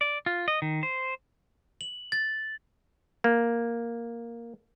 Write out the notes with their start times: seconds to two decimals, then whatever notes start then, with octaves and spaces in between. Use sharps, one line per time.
0.01 D5
0.26 F4
0.48 D#5
0.62 D#3
0.83 C5
1.81 F#7
2.12 A6
3.24 A#3